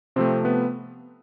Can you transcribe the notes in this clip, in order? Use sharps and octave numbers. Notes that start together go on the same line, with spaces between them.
C3 F3 A3 C4 C5
B3 B4